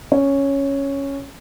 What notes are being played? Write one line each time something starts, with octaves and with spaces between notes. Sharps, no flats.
C#4 C#5